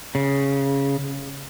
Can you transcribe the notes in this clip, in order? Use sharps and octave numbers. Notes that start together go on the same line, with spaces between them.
C#3